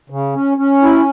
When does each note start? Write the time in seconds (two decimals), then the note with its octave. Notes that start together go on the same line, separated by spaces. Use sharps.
0.10 C#3
0.34 C#4
0.57 C#4
0.82 E4